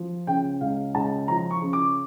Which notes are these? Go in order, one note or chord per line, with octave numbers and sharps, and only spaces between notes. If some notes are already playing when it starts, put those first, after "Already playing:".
Already playing: F3
C#3 G5
C#2 F5
C#2 A5
F3 A#5
C#6
C#3
D6